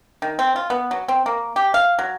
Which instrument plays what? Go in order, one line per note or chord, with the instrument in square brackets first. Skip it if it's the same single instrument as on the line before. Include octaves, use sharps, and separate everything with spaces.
[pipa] D#3
C4
F4
B3
F#3
C4
A#3
G4
F5
F#3